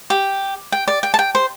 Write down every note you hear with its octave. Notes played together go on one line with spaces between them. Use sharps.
G4
G5
D5
G5
A5
G5
C5